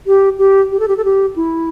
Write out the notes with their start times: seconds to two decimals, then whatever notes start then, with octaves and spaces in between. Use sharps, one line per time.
0.07 G4
0.38 G4
0.71 G4
0.80 A4
0.88 G4
0.97 A4
1.05 G4
1.36 E4